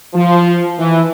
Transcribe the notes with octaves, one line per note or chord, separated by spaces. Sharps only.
F3
E3